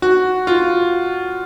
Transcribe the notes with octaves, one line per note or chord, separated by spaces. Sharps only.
F#4
F4